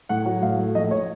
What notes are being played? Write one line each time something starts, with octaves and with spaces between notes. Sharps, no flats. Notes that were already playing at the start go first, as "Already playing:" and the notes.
A2 F#5
F#3
A2 F5
A3
A#1 D#5
C#5